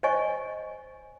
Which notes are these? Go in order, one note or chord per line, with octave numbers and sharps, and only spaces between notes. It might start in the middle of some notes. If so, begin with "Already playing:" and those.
C5 C#5 D#5 G#5 C#6